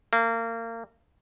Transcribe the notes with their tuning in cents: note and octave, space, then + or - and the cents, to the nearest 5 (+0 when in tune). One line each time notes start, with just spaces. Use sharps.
A#3 -30